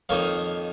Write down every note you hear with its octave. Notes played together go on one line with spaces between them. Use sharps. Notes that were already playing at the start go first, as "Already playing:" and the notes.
F2 D#3 A#3 D#4 C#5 F5